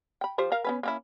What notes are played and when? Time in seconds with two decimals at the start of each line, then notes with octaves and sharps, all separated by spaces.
0.21 G5 B5
0.38 F3 G4 C5
0.52 A#4 F5
0.64 B3 C#4 B4
0.83 A#3 C#4 E4